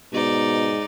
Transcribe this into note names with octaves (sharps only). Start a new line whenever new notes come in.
G#2 B2 D#4 D5